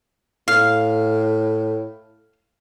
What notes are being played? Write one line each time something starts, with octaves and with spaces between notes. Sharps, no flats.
A2 F5